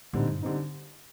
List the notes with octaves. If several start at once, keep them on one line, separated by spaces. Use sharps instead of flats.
A2 D3 G3 C4 D#4
G2
D3 G3 C4 D#4